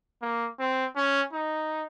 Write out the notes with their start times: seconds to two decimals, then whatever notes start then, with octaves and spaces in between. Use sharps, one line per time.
0.22 A#3
0.60 C4
0.96 C#4
1.33 D#4